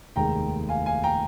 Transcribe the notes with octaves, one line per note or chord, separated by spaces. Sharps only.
F1 D#2 D#3 G#3 G5 A#5
F5 G#5
F5 G#5
G5 A#5